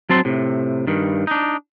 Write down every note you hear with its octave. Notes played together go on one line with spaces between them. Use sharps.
F#3 C4 A5 C6
A2 C3
G2 D#3
D4 D#4